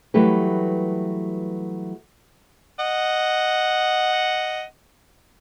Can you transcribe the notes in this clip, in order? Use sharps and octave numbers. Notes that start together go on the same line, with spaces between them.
E3 F#3 G3 A3 G4 B4
D#5 F#5